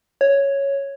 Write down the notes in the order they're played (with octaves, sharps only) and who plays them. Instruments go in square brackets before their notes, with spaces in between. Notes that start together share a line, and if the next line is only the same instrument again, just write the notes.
[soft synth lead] C#5